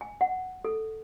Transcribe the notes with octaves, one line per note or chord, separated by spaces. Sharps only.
G#5
F#5
A4